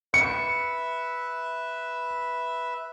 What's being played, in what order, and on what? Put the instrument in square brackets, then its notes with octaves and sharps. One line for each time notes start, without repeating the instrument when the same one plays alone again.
[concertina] B4 E5 [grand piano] C#7